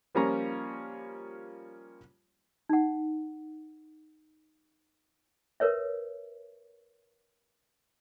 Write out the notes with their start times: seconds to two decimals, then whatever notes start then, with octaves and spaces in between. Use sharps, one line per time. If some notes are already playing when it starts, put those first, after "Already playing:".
0.15 F3 G3 A#3 C#4 F4 A#5
2.69 D#4 F#5
5.60 A#4 B4 C#5 E5